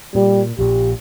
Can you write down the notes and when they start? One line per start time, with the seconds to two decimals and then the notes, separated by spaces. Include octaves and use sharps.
0.15 A#2 G3
0.59 A#1 A#2 G4